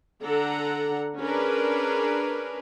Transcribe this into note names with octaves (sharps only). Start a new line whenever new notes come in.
D3 D4 A4 F#5 A#5
C#4 D4 G#4 A#4 B4